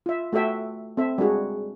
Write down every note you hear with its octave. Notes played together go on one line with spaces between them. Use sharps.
F4 E5
A3 F#4 A4 E5 G5
C4 A4 E5
G3 G#3 D4 F#4 G#4